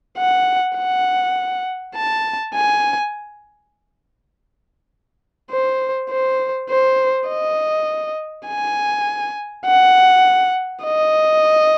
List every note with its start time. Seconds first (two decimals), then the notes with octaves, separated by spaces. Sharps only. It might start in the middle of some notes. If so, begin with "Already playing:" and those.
0.18 F#5
0.78 F#5
1.95 A5
2.55 G#5
5.51 C5
6.10 C5
6.69 C5
7.28 D#5
8.47 G#5
9.66 F#5
10.84 D#5